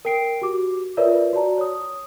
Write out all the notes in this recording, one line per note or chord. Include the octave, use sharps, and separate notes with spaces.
A#4 G5 C7 D7
F#4 G4 D6
F4 A#4 B4 C#5 D5 E5
F#4 D5 A5 A#5
C#5 D#6